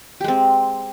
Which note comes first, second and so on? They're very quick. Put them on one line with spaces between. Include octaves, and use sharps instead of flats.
G4 G#3 C4